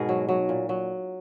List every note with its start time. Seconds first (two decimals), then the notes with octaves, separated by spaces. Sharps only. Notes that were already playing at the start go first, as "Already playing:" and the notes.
Already playing: G#2 B2 G#4 A#4
0.09 F#3
0.29 F#3
0.49 A#2
0.69 F#3